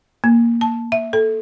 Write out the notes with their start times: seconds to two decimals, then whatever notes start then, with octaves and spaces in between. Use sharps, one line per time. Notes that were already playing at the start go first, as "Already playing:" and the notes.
0.24 A#3
0.61 A5
0.92 E5
1.13 A4